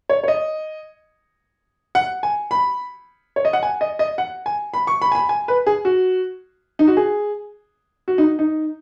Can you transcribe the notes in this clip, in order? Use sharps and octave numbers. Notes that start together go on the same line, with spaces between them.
C#5
C#5
D#5
F#5
G#5
B5
C#5
D#5
F#5
G#5
D#5
D#5
F#5
G#5
B5
C#6
B5
G#5
B5
G#5
B4
G#4
F#4
D#4
F#4
G#4
F#4
D#4
D#4